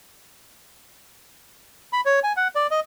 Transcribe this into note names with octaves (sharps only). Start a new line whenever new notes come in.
B5
C#5
G#5
F#5
D5
D#5